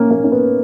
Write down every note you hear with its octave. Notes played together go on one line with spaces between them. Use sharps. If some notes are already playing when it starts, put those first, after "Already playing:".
Already playing: A#3 C#4
A#3
C#4
B3